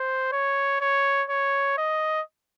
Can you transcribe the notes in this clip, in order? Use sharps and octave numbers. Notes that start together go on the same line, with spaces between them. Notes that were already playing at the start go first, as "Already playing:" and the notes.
Already playing: C5
C#5
C#5
C#5
D#5